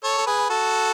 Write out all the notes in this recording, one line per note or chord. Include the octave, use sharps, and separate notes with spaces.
A4 C#5
A4
G#4 B4
F#4 A4